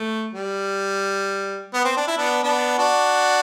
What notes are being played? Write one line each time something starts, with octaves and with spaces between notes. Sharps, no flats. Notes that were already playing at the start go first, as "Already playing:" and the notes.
Already playing: A3
G3
B3
C4
D4
E4
B3 D4
B3 D4
D4 F#4